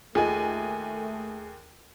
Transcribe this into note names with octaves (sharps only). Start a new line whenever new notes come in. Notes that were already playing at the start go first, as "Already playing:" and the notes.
D#2 A3 F4 G#4 A4 D#5 G#5